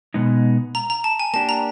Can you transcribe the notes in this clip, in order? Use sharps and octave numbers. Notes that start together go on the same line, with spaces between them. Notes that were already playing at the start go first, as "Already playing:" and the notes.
B2 G#3 B3 D#4
A#5
A#5
A5
G#5
A#3 D4 G4 A5
A#5